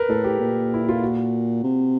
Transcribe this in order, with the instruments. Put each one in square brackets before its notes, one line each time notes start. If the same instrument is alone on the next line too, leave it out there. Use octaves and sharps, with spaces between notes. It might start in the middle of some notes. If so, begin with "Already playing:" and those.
Already playing: [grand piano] A#4 B4
[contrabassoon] A2 [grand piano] A4
[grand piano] G4
[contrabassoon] A#2
[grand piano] E4
F4
F#4
[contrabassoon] C3